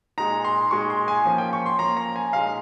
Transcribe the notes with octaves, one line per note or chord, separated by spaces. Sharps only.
A#2 G#3 D#4 A#5
C6
A#2 G#3 D#4 C#6
C6
G#5
F3 A#3 C#4
G5
C#6
C6
F3 A#3 C#4 A#5
A#5
G#5
A#2 G#3 D#4 F5